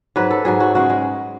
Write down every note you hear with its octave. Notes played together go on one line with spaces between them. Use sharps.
G#2 F#3 B4
A4
G#2 F#3 G#4
F#4
C#3 G#3 F#4
G#3